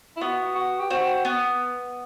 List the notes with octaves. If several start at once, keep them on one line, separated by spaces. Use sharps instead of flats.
E4
B3 F#4
F#4
G4
C4 F#4
B3